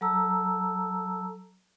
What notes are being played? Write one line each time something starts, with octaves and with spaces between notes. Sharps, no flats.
F#3 A4 A5 A#5 E6